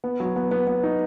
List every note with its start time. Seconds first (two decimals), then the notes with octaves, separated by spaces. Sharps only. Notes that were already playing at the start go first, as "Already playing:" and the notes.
0.04 B3
0.20 F#3
0.36 B3
0.51 B3
0.67 B3
0.83 D#4